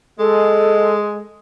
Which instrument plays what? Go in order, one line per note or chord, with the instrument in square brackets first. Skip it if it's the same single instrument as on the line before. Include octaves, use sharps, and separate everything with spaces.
[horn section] G#3 [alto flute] A4